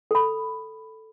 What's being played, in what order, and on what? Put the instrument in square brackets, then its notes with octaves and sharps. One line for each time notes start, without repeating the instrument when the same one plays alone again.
[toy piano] A4 B5